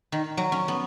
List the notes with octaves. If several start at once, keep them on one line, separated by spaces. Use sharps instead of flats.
D#3
F#3
C#4
B3